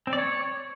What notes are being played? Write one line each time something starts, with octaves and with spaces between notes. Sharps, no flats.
C4
D5
C#5